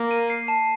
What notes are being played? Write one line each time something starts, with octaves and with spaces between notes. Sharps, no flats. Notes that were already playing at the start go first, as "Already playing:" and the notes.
Already playing: A#3
D#7
C7
A5